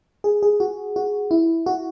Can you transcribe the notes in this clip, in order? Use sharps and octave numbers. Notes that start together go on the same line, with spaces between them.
G#4
G#4
F#4
F#4
E4
F#4